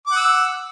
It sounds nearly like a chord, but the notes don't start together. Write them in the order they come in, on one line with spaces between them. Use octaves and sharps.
D6 F#5 E6